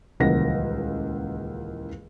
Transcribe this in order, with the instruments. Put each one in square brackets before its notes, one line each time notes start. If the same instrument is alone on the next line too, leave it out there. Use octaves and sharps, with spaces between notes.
[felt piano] D#1 C#2 E3 A#3 F#5 A#6